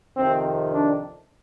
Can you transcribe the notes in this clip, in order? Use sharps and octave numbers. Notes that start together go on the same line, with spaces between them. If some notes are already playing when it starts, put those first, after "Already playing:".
F2 C3 D#3 C4
D4